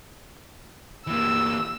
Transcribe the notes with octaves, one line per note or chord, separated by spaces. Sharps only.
E3 A#3 E6